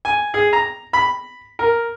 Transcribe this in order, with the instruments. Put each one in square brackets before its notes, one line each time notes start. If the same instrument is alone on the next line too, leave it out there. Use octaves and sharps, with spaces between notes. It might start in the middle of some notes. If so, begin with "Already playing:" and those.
[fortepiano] G#5
G#4
A#5
B5
A#4